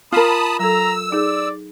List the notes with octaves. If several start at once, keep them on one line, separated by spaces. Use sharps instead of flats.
F4 A#4 A5 B5 D#6
F#3 A4 A#5 E6
D#4 G#4 D5